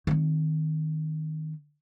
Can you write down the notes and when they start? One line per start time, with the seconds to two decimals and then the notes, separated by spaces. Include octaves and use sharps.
0.07 D#3 C4